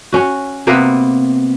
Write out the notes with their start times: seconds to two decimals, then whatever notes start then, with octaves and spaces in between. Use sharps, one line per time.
0.12 C#4 F#4
0.67 C3 A#3 B3 B4